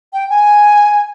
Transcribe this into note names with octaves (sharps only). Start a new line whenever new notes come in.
G5
G#5